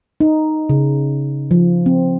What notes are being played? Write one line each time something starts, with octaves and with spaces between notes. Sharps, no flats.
D#4
C#3
F3
C4